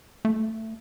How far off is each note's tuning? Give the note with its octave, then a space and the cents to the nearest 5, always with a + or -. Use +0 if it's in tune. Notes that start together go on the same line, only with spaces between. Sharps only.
A3 +15